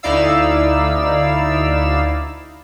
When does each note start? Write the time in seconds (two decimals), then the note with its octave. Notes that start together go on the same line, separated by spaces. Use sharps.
0.03 D2 D#4 E4 D5 F5 E6